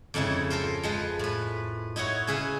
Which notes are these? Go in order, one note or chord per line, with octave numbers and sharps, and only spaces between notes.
F2 G#2 C#3 G#3 E4
F4 A4 A#4 C5
F3 G#3 B4
A2 B4
D#4 E4 F#4 C#5
C#3 C#4 G#4 B4 E5 F5